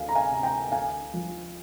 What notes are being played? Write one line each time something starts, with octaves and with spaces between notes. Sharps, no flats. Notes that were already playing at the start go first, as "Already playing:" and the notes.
Already playing: D2 F5 G#5
A#5
F5 G#5
C3
G5 A#5
D2 F5 G#5
F3